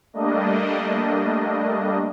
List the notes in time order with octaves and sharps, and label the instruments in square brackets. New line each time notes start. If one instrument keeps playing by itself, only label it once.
[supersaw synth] G3 A3 A#3 D4 D#5